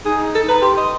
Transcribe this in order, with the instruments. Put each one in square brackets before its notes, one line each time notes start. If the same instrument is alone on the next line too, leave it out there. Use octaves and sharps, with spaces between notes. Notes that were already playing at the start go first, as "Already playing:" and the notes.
[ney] D#4 [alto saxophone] G#4
[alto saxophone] A4
[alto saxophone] B4 [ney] A#5
[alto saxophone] G4 [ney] C6
[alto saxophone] D#5